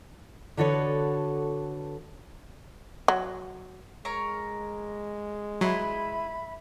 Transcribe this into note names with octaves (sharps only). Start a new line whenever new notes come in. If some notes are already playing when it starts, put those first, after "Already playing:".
D3 D4 F#4 A4 B4 C#5
F#3
G#3 A#4 C#5 A#5
F#3 E4 B4 E5 B5 C6